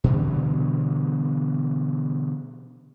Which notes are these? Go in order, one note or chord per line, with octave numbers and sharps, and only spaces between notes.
B2 D3 E3 G3